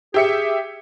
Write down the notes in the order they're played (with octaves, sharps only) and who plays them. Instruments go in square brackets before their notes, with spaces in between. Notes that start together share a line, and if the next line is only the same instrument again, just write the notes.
[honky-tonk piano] G4 E5 C#7 [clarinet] G#4